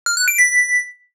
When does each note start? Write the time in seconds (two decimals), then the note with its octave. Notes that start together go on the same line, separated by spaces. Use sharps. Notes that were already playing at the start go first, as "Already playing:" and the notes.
0.06 F6
0.17 F#6
0.28 D7
0.38 B6